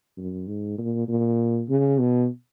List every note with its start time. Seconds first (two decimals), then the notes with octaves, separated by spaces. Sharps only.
0.17 F#2
0.47 G#2
0.78 A#2
1.09 A#2
1.69 C#3
1.99 B2